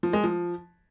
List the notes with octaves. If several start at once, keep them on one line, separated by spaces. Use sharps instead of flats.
F3
G#3
F3